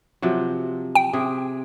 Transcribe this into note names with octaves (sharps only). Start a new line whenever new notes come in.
C3 F3 F#3
G5
C3 G#4